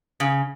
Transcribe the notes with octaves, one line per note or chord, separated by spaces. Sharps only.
C#3